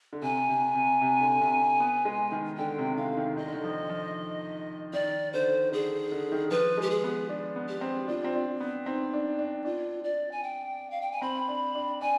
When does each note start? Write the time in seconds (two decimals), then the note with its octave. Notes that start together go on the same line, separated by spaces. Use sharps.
0.13 D3
0.22 C3 G#5
0.49 C3
0.75 C3
1.02 C3
1.21 D3
1.41 C3
1.80 B3
2.05 G#3
2.32 D#3
2.58 D3 G5
2.78 C3
2.97 D3 F5
3.17 D#3
3.37 D#3 D#5
3.46 D3
3.54 D#3
3.64 F3
3.89 F3
4.93 D#3 D5
5.33 D3 C5
5.72 D3 G#4
6.12 D3
6.32 D#3
6.51 F3 B4
6.77 G#3 G4
6.90 G#4
7.04 B3
7.29 D4
7.56 B3
7.69 G4
7.81 C4
8.08 D4 F4
8.24 C4
8.35 D4
8.60 B3
8.86 C4 D#4
9.13 D4
9.39 D4
9.65 D4 F4
10.04 D5
10.32 G#5
10.43 G5
10.91 F5
11.01 G5
11.12 G#5
11.22 C4 B5
11.48 D4
11.75 D4
12.01 D4 G#5